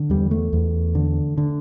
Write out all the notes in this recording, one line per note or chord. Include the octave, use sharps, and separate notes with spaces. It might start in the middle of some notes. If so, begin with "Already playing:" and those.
Already playing: D3
E2 G3
A3
E2
D3
D3